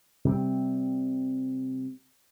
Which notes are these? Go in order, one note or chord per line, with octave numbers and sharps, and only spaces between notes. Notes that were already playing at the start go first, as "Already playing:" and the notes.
C3 G3 C4